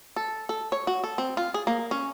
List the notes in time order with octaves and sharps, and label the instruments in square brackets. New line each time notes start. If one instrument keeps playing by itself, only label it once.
[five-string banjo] A4
A4
C#5
F#4
A4
C4
F4
G#4
A#3
C#4